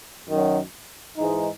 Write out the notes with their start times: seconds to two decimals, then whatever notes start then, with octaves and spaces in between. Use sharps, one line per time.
0.28 F#2 D#3 F#3
1.18 G#2 E3 G#3 D#4